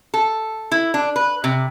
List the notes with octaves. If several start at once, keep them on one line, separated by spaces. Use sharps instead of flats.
A4
E4
D4
B4
C3